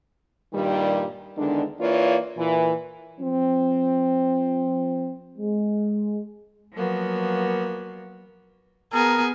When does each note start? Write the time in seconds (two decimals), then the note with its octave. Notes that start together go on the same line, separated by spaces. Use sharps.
0.53 G2 A#2 D#3 G3
1.37 E2 D3 D#3 G#3 D4
1.79 E3 A#3 F4 C#5 D5
2.37 A#2 E3
3.18 F3 C4
5.38 G#3
6.74 F3 F#3 A#3 B3 F#4
8.93 B3 G#4 A#4